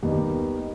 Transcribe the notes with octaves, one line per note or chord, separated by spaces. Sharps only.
D#2 D#3 G3 B3 D#4